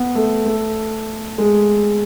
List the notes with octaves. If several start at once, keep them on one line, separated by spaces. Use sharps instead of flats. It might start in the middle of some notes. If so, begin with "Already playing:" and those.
Already playing: B3
A3
A3
G#3